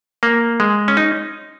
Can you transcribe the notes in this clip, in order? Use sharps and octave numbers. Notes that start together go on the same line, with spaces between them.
A#3
G#3
C#4
D#4